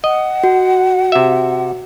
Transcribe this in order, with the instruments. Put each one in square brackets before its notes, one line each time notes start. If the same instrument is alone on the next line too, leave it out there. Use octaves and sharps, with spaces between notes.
[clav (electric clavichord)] D#5 [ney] F#5
[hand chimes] F#4
[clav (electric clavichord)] C3 E5